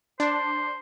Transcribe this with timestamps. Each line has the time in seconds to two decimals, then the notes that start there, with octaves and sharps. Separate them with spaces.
0.20 D4 C5